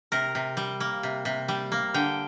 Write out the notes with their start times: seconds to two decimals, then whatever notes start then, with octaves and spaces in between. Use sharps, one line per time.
0.12 C3 A#4
0.35 C3
0.57 G3
0.80 A#3
1.03 C3
1.25 C3
1.48 G3
1.72 A#3
1.94 D3 G5